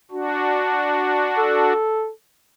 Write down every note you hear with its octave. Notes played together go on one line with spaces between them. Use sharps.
D4 F#4
A4